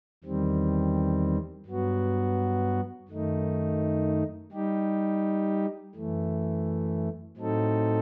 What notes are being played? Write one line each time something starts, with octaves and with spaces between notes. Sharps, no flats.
E2 D#3 G3 C4
G2 F#3 B3 F#4
F#2 D#3 A3 D#4
G3 D#4 G4
F#2 E3 A3
A2 F#3 C4 D#4 A4